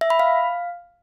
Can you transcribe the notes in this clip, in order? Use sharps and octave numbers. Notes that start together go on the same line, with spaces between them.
E5
B5
F5